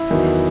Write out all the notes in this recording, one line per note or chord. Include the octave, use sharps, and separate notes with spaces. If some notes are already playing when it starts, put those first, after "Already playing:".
Already playing: E4
E2 D#3 F#3